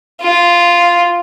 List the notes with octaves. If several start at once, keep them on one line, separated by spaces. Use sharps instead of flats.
F4